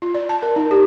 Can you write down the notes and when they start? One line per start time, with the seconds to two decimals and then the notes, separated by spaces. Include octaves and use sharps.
0.02 F4
0.14 D5
0.29 A5
0.42 A#4
0.56 D#4
0.71 G4